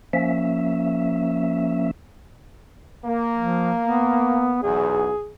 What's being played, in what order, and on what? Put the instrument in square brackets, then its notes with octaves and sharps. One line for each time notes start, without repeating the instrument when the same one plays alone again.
[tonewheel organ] F3 A#3 C#4 E5
[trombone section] A#3
[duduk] F3
B3
[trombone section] B1 E2 [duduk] G#4